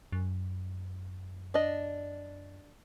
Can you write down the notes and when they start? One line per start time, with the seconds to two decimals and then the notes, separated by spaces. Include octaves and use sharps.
0.12 F#2
1.54 D4 D#5